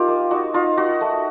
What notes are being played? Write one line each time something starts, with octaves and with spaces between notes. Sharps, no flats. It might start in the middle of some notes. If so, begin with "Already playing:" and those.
Already playing: D#4 F4 G4 A#4
A#3
D#4 F#4
D#4 F4
D#4 F#4
A3